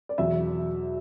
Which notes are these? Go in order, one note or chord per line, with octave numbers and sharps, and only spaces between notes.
D5
E2 B2 F#3 E5